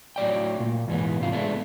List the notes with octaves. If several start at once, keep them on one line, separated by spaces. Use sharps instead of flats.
A2 F#3 D5 G5
A#2
E2 G#2 D#3 E3 B3
G#2 C3 F4
G#3 A3 B3 D4